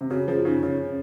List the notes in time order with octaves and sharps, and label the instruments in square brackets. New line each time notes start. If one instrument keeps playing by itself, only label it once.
[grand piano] C3
[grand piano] C#3 [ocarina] F#4
[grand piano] F3 [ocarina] G#4
[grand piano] C#3 [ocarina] D#4
[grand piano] C#3 [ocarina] C#4